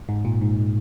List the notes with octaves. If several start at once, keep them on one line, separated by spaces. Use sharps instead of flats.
G#2
A#2
G#2